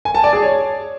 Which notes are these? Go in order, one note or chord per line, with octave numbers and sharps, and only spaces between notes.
G#5
A5
D5
G#4
C#5